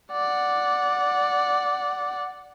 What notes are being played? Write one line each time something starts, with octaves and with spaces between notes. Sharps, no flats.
D5 F#5